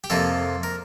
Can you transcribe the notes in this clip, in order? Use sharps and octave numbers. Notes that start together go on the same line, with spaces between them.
G4
F2 C3 F3 A#3 A4
A#4